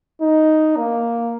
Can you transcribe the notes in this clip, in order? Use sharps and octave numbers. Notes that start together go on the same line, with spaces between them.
D#4
A#3